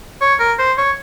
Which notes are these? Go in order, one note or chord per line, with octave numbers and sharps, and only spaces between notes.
C#5
A#4
C5
C#5